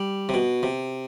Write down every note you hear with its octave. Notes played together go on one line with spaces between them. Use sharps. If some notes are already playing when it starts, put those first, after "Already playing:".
Already playing: G3
C3
B2
C3